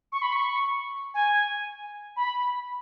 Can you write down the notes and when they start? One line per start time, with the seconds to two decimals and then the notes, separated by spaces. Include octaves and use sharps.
0.12 C#6
0.22 B5
0.33 C#6
1.14 G#5
2.16 B5